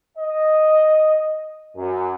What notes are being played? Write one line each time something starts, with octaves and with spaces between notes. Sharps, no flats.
D#5
F#2